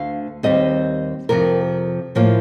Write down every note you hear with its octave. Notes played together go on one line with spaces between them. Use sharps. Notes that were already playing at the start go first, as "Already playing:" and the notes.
Already playing: D2 D3 A3 F5
D#2 D#3 G3 C4 D#5
F2 C3 F3 A#4
A2 F3 A#3